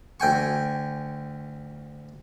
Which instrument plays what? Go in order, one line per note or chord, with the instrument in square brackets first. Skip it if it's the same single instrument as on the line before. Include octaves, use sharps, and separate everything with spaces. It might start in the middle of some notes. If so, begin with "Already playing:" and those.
[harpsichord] D2 G5 G#5 C#6